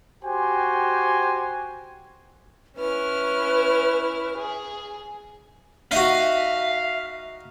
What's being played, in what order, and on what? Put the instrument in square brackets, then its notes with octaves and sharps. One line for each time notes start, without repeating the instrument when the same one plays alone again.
[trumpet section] F#4 G4 C5 G5 G#5
[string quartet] C#4 E4 F6 [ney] B4
[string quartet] G#4
[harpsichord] D#4 F#4 [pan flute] E5 [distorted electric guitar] F5